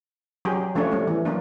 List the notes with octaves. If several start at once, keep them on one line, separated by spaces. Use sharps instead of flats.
F#3 G4 G#4
F3 A3 C#4 D4 C#5
G3 A3
E3
F#3 A#3 D4